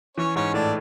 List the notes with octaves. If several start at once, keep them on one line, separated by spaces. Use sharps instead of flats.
E3 C#4 C#5
G#2 C#4 C#5
A2 D4 D5